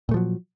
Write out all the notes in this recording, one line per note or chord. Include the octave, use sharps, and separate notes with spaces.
A#2 F3 F#3 A3